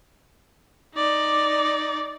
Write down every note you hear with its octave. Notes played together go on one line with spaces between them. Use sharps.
D#4 D5